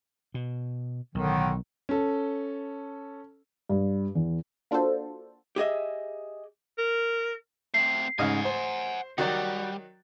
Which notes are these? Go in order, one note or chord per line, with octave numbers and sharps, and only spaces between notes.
B2
B1 A2 D3 D#3
C#4 A4
G2
E2
A#3 D4 F4 F#4 A4 C5
G4 G#4 D#5 E5
A#4
A3 C4 C7
A1 G#2 C#3 D#5 F5 F#5 G#5
C5
D#3 F#3 G3 F#4 D5